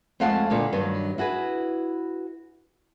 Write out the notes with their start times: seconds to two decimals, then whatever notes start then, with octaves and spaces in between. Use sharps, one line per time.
0.20 F2 G#3 A3 F5 F#5 A5
0.50 A#2 D3 B3 F5
0.73 G2 D#3 F#3
1.18 E4 F#4 G#4 B4